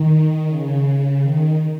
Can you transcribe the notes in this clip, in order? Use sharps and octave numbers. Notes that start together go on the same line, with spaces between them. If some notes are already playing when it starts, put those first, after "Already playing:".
Already playing: D#3
C#3
D#3